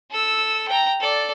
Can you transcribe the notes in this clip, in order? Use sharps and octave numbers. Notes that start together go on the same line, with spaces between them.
A4 E6
G5 A#5
A4 D5